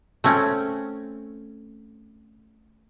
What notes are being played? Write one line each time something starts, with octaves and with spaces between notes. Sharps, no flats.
A3 C4 C#4